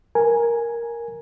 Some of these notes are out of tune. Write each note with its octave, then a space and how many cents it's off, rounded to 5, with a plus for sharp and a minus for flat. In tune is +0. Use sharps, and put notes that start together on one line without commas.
A#4 +5 G#5 +0